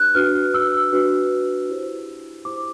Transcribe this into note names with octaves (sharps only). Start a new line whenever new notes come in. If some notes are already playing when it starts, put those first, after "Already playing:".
Already playing: D4 F#4 B4 F#6
D4 F#4 B4 F6
E6
D4 F#4 B4
E4 G4 C5
E4 G4 C5 D6